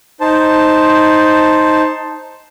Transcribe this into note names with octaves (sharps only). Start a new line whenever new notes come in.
D#4 C5 A5